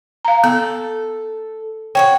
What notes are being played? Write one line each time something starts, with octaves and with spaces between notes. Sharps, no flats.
F5 A#5
B3 A4
F#4 G#4 C#5 G5